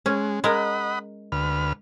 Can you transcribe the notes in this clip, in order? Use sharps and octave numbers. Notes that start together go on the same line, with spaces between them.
G#3 C#4
G#3 A#4 D#5 F#5 B5
D2 B4 F6